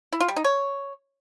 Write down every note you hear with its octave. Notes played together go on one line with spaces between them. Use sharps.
E4
F4
G3
D#4
C#5